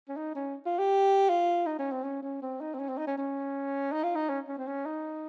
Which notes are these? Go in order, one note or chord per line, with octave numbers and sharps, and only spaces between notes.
C#4
D#4
C#4
F4
G4
F4
D#4
C#4
C4
C#4
C#4
C4
D#4
C4
C#4
C4
D#4
C#4
C#4
D#4
F4
D#4
C#4
C#4
C4
C#4
D#4